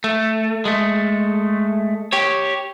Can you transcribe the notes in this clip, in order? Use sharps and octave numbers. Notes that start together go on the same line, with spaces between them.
A3
G#3 A3
G4 C#5